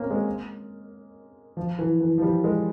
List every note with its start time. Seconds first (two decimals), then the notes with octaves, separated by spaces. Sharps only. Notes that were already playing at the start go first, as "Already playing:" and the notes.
Already playing: A#3 C4 C#4
0.10 G#3
1.57 F3
1.79 E3
2.01 E3
2.18 F3
2.22 G3
2.44 G#3